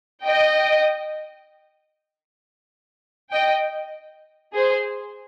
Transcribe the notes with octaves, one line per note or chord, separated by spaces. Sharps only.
D#5 G5
D#5 G5
G#4 C5